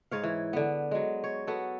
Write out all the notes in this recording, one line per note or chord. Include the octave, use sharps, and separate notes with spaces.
G#2 C#5 F5
E3
D3 B3
F#3 G#3
C#5
B3 F#4 A4